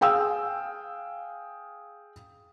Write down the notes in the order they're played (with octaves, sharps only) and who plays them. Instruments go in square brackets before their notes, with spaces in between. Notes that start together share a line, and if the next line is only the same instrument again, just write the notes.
[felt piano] G#4 F5 G5 E6